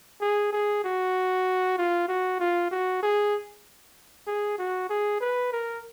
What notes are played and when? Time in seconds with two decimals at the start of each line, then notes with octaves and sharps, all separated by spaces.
0.21 G#4
0.53 G#4
0.84 F#4
1.78 F4
2.08 F#4
2.40 F4
2.71 F#4
3.02 G#4
4.27 G#4
4.58 F#4
4.90 G#4
5.21 B4
5.52 A#4